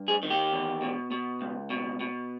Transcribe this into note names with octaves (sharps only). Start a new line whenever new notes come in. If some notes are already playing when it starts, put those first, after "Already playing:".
Already playing: G2
G#4
D#3
G4
E2
B2
B2
C#2
B2
B2